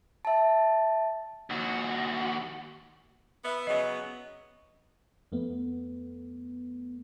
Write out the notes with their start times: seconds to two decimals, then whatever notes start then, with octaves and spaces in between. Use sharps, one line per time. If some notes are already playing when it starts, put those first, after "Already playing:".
0.25 E5 A5
1.50 D#2 F#4
3.43 B3 E5
3.67 C#3 F#3 B3 D#5
5.32 F2 A3 B3